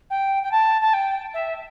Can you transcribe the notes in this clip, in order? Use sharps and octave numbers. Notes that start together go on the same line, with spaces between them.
G5
G5
A5
A5
G5
E5